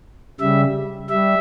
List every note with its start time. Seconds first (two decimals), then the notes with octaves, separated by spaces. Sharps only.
0.40 C#3 G3 E5
1.10 G3 E5